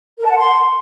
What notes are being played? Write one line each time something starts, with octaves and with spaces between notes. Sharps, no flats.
A#4
A5
F#5
C6